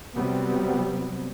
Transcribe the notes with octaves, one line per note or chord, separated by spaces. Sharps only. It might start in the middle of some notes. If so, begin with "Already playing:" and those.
C3 F#3 G3 B3 C4